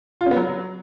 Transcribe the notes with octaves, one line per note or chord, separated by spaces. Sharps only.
F4
C#4
B3
F#3